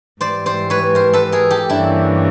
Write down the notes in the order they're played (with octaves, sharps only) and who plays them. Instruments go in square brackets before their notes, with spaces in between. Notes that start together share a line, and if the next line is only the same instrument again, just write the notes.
[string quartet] G#2 E3 G3 [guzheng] C5 D5
[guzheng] C5 D5
B4 C#5
A#4 C5
A4 B4
G#4 A#4
G4 A4
[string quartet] G2 E3 G3 A#3 C#4 [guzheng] D4 E4